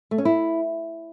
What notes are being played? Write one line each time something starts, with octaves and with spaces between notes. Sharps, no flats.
A3
C#4
E4